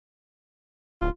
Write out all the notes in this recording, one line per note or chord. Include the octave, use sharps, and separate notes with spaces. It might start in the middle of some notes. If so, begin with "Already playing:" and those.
D1 F4